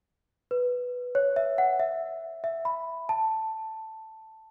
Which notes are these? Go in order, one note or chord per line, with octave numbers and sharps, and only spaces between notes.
B4
C#5
E5
F#5
E5
E5
B5
A5